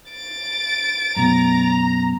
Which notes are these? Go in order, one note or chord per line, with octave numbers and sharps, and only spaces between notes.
A6 D7
F#2 B2 A#5